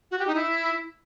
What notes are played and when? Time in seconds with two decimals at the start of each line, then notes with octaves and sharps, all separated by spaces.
0.11 F#4
0.19 G4
0.27 D#4
0.35 E4